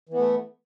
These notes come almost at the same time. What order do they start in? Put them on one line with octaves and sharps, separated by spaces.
E3 B3 A3